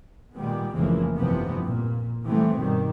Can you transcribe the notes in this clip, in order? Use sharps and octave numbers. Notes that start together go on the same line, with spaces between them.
A#2 D#3 G3 G#3 B3
F1 F2 C#3 E3 G#3 A#3
G1 F2 C3 E3 F3 B3
A#2
C3 E3 G3 A3 B3 C4
G2 B2 D#3 G3